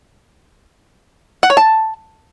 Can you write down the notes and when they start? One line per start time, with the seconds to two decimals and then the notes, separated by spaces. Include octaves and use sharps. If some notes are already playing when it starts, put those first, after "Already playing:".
1.43 F#5
1.50 C#5
1.57 A5